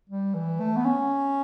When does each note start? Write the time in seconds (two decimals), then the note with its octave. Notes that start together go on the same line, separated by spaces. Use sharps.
0.10 G3
0.34 E3
0.60 A3
0.76 B3
0.85 C#4